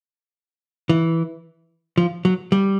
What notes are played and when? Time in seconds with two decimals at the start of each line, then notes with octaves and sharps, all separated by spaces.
0.89 E3
1.98 F3
2.25 F#3
2.52 G3